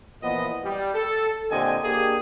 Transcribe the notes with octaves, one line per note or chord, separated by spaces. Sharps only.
A#2 E3 F3 B3 D#5
G3
A4
A#2 D3 C4 G4 D#5 G#5
A#3 D4 G4 G#4